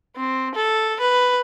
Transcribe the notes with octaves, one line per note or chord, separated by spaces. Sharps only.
C4
A4
B4